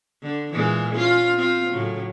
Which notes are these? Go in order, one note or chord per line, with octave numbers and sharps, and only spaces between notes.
D3
A#2 E3 G#3
C#4 F4
C4 F4
A2 C#3 F#3